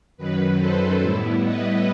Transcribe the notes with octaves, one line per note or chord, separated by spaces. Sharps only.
F#2 D#3 F#3 B4
A4 C5
A2 G3 B3 E4
B4 D#5